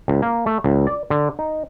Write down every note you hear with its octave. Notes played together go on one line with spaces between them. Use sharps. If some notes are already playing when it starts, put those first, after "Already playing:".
C#2
A#3
A3
C#2
D5
D3
D#4